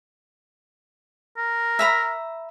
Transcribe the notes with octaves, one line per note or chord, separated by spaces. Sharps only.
A#4
E5 A#5 B5